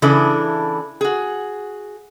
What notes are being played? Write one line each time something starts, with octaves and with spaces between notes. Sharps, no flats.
C#3 E3 D4 E4 A4
F#4 G#4